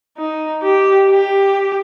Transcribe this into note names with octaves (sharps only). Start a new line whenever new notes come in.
D#4
G4
G4